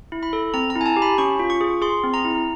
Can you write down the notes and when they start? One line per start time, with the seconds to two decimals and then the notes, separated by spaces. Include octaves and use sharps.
0.12 E4
0.23 B5
0.33 A4
0.54 C4 A#5
0.70 A#5
0.76 E4
0.81 G#5
0.86 A5
0.97 G4
1.02 B5
1.18 C#4 C#6
1.40 F4
1.50 C#6
1.61 G#4
1.82 G#4 C6
2.04 C4
2.14 A#5
2.25 E4